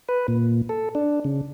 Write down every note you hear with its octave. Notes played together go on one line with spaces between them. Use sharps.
B4
A#2
A4
D4
C#3